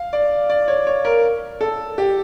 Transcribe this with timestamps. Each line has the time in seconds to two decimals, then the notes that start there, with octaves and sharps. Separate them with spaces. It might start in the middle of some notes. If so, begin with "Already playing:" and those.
Already playing: F5
0.13 D5
0.50 D5
0.68 C#5
0.87 C#5
1.05 A#4
1.61 A4
1.98 G4